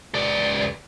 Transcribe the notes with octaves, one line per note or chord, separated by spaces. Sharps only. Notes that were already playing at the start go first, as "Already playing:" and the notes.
C#2 D5